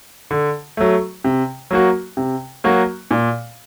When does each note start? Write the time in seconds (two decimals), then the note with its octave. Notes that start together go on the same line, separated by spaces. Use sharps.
0.31 D3
0.77 F#3 A3
1.24 C3
1.71 F#3 A#3 F#4
2.17 C3
2.64 F#3 A#3 F#4
3.11 A#2